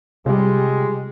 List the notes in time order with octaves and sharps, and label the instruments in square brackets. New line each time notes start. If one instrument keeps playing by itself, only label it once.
[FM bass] C3 [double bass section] G3 [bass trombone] G#3 [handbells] F4 G4